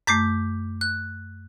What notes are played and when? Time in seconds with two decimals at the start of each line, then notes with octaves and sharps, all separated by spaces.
0.07 F#2 A3 D6 G6 B6
0.81 F#6